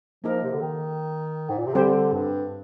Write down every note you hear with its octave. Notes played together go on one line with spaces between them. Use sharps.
F3 A#3 D#4 A#4
C3
D3
D#3
G#2
A#2
C3
D3 G3 C4 G4 C5
G2